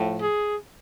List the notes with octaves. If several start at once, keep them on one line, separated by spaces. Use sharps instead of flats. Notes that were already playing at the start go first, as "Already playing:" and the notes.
Already playing: A2 F3
G#4